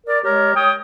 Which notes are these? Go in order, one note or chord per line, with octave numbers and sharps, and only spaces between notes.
A#4 D5
G#3 G4 A#4 C#5
C#5 G5 D#6